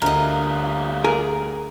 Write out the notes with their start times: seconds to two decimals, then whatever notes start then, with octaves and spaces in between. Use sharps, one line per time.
0.02 D2 G3 F4 A#4 D#5
1.04 G#4 A#4